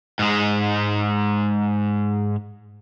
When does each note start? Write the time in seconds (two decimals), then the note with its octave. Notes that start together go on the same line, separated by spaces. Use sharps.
0.19 G#2 G#3